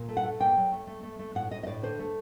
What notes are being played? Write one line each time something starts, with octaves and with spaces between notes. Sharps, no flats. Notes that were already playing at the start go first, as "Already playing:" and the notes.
Already playing: A#2
A3
F#5
A3
A#2 G5
F#3
A3
A3
A3
A3
A2 F#5
A2 D#5
D#5
A2 D5
D3 C5
A3